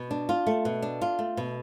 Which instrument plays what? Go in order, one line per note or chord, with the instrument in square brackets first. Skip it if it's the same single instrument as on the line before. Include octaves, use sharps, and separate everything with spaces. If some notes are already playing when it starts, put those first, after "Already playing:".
Already playing: [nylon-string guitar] B2
D4
F4
A3
B2
D4
F4
A3
B2